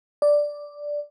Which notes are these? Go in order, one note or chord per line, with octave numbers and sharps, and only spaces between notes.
D5